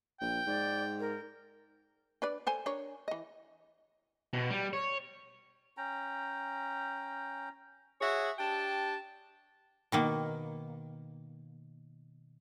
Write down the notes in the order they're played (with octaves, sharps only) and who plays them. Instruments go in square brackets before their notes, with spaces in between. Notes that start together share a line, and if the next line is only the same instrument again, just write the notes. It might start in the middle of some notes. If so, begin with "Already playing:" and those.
[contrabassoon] A#1 [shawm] G5
[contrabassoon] G#2 [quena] D5
[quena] A#4
[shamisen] D4 B4 D5
A4 C5 G#5
D4 A#4 C#5
E3 D#5
[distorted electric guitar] B2
G3
C#5
[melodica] C#4 G5 A#5
[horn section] F#4 G#4 C#5 E5 F#5
D4 G4 G5 A5
[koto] B2 D#3 A#3